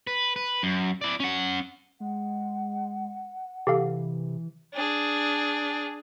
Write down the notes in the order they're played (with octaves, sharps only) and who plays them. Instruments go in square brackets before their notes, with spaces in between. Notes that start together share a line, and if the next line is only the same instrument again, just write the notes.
[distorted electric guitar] B4
B4
F#2
E4 D5
C#4 F#5
[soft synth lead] G#3 [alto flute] F#5
[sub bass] C3 [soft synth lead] E3 [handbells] G4 A4 F5
[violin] D4 G#4